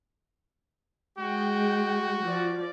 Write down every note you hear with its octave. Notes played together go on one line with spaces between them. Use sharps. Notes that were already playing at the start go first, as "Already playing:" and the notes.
G#3 F#4 G5
F3 D5